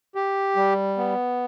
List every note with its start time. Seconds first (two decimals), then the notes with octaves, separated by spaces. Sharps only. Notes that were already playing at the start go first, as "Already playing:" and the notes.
0.15 G4
0.56 G3
0.97 B3